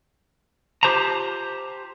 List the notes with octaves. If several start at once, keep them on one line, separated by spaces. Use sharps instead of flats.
F4 G4 C5 A5 A#5